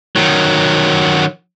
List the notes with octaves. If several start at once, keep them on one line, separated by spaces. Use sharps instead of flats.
D#3 F#3